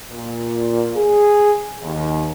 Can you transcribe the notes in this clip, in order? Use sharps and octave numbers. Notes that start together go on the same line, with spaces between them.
A#2
G#4
D#2